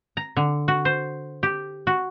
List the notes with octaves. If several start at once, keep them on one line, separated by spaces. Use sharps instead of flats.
A#5
D3
F#4
C5
G4
F#4